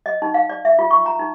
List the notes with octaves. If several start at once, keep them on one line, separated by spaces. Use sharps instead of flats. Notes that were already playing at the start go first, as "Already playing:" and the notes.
D#5
D#4
F5
D5
E5
F4
C#6
A#5
D#4